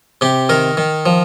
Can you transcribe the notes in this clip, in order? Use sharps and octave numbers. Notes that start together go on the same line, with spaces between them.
C3 G4
D#3 A#4
D#3
F3